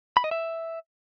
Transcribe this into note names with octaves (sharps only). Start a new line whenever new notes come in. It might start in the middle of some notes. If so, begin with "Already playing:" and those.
B5
D#5
E5